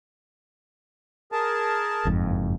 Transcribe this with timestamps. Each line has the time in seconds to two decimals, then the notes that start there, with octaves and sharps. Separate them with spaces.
1.32 G#4 A#4 A5
2.05 F#1 F2 G#2